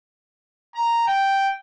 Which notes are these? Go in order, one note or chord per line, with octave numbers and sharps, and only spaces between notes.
A#5
G5